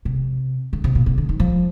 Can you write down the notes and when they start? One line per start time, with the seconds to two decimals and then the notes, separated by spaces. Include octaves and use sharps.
0.05 C3
0.73 D3
0.84 C3
0.95 A#2
1.06 C3
1.18 D3
1.29 D#3
1.40 F3